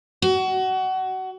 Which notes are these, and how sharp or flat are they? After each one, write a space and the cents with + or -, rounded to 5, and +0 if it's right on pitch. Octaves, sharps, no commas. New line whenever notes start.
F#4 +25